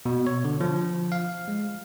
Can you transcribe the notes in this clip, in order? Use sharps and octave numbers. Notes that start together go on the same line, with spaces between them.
B2
C#5
D3
F3
F5
G#3